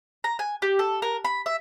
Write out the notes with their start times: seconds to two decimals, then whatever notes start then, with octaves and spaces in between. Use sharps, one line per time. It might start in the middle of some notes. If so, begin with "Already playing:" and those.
0.24 A#5
0.39 G#5
0.62 G4
0.79 A4
1.02 A#4
1.25 B5
1.46 E5